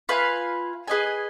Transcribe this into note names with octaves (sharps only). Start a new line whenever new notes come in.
F4 B4 F5 G#5
G#4 B4 D#5 G#5